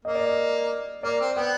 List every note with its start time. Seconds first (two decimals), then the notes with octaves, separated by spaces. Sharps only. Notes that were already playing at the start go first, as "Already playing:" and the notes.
0.05 A#3 D#5
0.15 D5
0.26 D#5
1.03 A#3 D5
1.20 C4
1.36 B3 G5